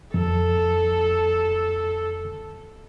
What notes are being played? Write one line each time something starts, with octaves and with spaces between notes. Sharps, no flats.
F2 A4